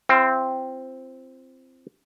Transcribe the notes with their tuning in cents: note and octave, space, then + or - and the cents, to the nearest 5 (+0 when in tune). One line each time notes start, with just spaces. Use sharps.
C4 +0 F4 -40